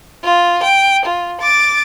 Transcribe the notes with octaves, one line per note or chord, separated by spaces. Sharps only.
F4
G5
F4
D6 A6